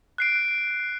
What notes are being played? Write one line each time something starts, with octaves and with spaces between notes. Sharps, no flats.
F#6 C7 D7